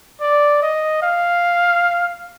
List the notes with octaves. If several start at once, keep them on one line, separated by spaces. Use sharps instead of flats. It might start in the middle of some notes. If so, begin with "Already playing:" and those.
D5
D#5
F5